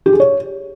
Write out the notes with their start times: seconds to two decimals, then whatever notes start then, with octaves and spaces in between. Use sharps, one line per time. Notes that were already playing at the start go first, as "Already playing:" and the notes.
0.06 G4
0.13 G#4
0.20 C#5